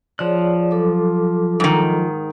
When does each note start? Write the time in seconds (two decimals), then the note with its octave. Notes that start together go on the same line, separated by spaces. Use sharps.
0.19 F3 G#4 C#5 D5 F#6
0.71 F#3 A4 D6
1.60 G#2 D#3